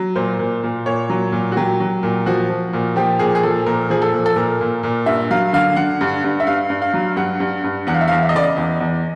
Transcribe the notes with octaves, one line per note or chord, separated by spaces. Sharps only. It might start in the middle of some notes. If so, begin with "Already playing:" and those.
Already playing: F#3
A#2 C5
A#2
A#2
A#2 C#5
F#3
A#2
F#4
F#3 G4
F#3
A#2
F3 F#4
F3
A#2
F3 G4
A#2 G#4
G#4
F3 A4
A#2 A#4
F3 G#4
A4
A#2
A4
A#2 A#4
A#2
A#2
G2 E5
F#3 F5
D3 F5
D3 F#5
G2
G2
E5
G2 F5
G2
F5
F#3
G2 F#5
G2
G2
E2 F#5
F5
E5
E2 F5
E5
D#5
C#3 D5
D#5
E2
E2